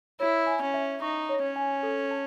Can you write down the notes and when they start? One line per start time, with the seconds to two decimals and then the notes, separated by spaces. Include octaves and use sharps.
0.20 E4 C#5
0.47 G#5
0.61 C#4
0.74 E5
1.02 D#4 C#6
1.29 C#5
1.42 C#4
1.56 G#5
1.83 A4
2.11 A5